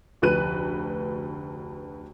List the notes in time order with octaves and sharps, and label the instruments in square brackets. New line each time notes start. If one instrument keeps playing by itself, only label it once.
[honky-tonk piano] F1 D2 B4 F#6 D#7